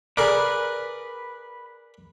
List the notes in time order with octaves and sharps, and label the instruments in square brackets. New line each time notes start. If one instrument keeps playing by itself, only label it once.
[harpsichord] G#4 A#4 D5 [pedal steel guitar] B4